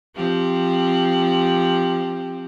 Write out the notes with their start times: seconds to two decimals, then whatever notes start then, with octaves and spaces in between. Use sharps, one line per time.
0.16 F3 C4 G4